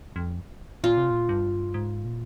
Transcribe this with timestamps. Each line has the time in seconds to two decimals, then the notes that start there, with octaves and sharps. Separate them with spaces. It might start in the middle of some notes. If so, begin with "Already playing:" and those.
0.16 F2
0.84 A#2 F4
0.97 C3
1.10 A#2
1.29 G2
1.74 G#2
2.05 A#2